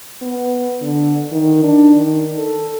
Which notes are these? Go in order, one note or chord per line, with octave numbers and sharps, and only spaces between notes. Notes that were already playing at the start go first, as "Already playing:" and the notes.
B3
D3
D#3
D4
D#3
A4